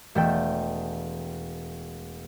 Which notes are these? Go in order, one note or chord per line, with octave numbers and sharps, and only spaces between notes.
E1 A3 A4 G5